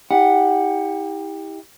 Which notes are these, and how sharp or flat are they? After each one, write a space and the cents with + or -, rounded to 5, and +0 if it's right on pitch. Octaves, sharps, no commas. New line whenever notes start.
E4 -35 G4 +20 F#5 +0